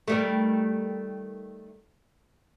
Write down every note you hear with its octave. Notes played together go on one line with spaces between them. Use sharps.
D#3 G3 A3